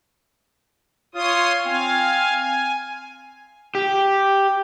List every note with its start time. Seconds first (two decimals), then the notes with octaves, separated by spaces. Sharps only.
1.15 F4 C#5 C6 D#6
1.66 C4 F5 G#5
2.37 G#5
3.75 G4